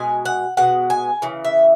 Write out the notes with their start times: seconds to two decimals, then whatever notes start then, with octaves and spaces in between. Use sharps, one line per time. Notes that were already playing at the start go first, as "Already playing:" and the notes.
Already playing: B2 G#3 G#5
0.25 F#5
0.57 B2 G#3 F#5
0.90 G#5
1.22 C#3 E3
1.44 E5